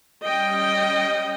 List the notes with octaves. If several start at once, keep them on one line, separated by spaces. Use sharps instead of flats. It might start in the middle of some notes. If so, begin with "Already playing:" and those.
G3 C#4 D#5 G5